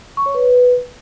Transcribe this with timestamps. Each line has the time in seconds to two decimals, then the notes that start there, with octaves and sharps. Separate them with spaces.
0.17 C#6
0.26 C#5
0.34 B4